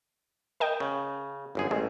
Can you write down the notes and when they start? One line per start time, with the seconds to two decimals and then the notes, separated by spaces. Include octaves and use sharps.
0.60 A#4 D#5 G5
0.80 C#3
1.55 G1 F#2 G#4
1.71 A1 G#3